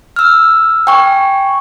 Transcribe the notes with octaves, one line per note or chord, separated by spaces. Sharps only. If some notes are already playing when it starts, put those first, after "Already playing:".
E6 F6
G5 G#5 C#6